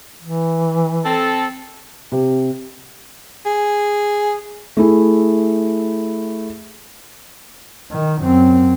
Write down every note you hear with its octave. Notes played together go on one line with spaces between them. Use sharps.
E3
C4 A4
C3
G#4
A3 E4 G#4
D#3
F#2 C4